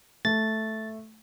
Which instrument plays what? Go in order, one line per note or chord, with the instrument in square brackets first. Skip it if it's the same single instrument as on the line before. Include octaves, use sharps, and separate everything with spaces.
[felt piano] A3 [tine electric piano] A6